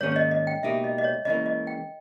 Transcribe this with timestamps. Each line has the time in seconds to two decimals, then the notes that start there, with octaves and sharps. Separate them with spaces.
0.01 G#2 D#3 A#3 C#4 G#4 C#5
0.12 C#5
0.16 D#5
0.31 D#5
0.47 G5
0.63 C#2 B2 A#3 D#4 G4 E5
0.84 D#5
0.98 D#5
1.04 C#5
1.25 C#2 C#3 E3 A#3 D#5
1.46 D#5
1.67 G5